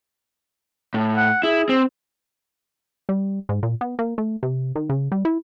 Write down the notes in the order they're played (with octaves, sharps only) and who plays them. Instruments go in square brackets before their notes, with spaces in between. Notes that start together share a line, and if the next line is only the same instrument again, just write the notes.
[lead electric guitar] A2
[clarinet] F#5
[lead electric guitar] E4 [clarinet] G#4
[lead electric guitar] C4
[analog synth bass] G3
G#2
A#2
B3
A#3
A3
C3
D#3
C#3
G3
E4